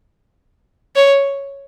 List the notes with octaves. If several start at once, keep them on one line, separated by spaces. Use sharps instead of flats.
C#5